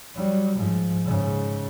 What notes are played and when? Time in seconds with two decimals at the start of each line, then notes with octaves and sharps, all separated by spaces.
0.14 F#3 G3
0.55 G#2 F3
1.04 G#2 C#3